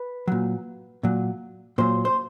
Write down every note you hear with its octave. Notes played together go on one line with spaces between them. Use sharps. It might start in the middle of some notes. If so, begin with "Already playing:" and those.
Already playing: B4
A#2 F#3
A#2 F#3
A#2 F#3 C5
C5